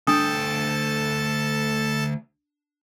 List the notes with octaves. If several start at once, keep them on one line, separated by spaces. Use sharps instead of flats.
D2 D4 A4 G5 A5 D#6